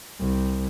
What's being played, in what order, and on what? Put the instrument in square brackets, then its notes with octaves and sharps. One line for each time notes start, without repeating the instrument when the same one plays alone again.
[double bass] C2